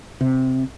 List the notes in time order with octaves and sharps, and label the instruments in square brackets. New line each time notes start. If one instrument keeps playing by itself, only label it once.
[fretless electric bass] C3